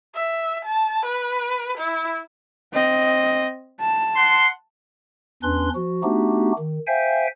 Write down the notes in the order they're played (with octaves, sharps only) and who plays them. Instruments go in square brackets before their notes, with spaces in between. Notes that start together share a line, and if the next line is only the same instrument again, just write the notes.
[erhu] E5
A5
B4
E4
[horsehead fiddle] C4 D#5
A5
[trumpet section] F#5 C6
[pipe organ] E2 C#4 D4 B4 C6 F#6
F3 F#4
A3 B3 D4 D#4 F#4 G4
D#3
C5 E5 F5 G5 G#5 G6